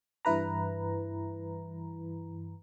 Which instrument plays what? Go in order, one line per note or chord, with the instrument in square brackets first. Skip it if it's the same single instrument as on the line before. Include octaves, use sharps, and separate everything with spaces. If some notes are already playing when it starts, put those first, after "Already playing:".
[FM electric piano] G2 E3 E4 B4 A#5